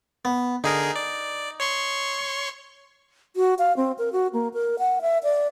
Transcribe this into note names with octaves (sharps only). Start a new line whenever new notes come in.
B3
D3 D#4 G#4 A#4
D5
C#5 C6 C#6
F#4
F5
C4
A#4
F#4
A#3
A#4
F#5
E5
D5